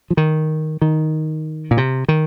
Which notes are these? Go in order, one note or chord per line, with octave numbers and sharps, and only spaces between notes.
F3
D#3
D#3
A#2
C3
D#3